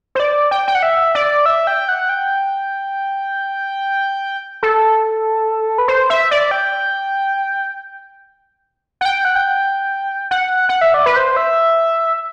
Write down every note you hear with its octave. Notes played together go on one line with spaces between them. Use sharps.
C5
D5
G5
G5
F#5
E5
D5
E5
G5
F#5
G5
A4
B4
C5
E5
D5
G5
F#5
G5
F#5
G5
F#5
F#5
E5
D5
B4
C5
E5